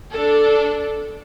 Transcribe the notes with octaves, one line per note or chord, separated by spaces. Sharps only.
D4 A4